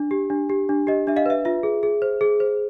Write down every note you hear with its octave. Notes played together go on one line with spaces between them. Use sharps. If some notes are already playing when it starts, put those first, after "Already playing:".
Already playing: D4
G4
D4
G4
D4
G4 D#5
D4 E5
D#5 F5
B4 E5
F4 E5
G#4
G#4
C5
G#4
C5